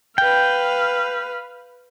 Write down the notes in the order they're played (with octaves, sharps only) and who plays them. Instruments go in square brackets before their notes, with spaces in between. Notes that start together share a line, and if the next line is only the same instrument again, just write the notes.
[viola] B4 F5 [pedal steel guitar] G5